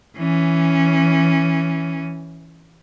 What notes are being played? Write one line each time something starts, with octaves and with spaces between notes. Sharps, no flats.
E3 C#4